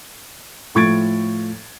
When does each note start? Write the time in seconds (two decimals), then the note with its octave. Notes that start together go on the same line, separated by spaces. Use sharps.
0.75 A2 F3 C#6 G#6 A6 D7